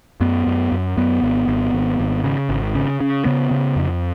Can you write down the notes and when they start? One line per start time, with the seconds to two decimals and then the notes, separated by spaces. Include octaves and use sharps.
0.21 F#2 B3
0.46 F#2
0.72 F#2
0.97 F#2 B3
1.22 G#1
1.47 G#1
1.73 G#1
1.99 G#1
2.24 C#3
2.49 G#1
2.75 C#3
3.01 C#3
3.25 C#3 B3
3.51 C#3
3.76 F2